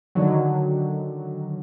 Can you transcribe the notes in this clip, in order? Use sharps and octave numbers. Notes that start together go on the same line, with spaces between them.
D3 D#3 F#3